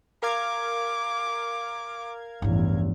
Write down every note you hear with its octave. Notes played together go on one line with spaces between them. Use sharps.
A#4 F5 D6 G#6
A1 E2 G2 F3